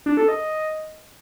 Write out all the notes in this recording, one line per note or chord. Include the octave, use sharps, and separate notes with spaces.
D4
A4
D#5